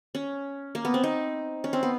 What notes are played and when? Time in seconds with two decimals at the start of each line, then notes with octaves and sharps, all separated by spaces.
0.15 C#4
0.75 A#3
0.85 B3
0.94 C4
1.04 D#4
1.64 C#4
1.73 C4
1.83 B3